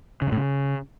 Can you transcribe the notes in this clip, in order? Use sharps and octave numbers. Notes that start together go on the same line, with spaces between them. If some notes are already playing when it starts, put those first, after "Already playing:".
C#3
F#2
A2
C#3